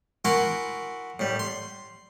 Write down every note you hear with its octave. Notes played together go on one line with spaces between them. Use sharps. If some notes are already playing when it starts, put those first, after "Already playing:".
E4 F#4 A#4 G#5 C6 D6
A2 G3
C6